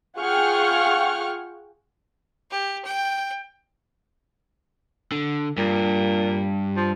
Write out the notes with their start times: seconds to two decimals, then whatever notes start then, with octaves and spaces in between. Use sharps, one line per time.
0.18 F4 G#4 F#5 G5 C#6 F6
2.51 G4
2.85 G5
5.12 D3
5.57 G2 A#2
6.77 F3